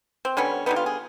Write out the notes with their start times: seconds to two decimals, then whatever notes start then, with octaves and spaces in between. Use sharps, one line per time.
0.25 C4
0.37 D3 G3 B3 C#4
0.66 D3 G3 B3 D#4
0.76 F4
0.86 G#4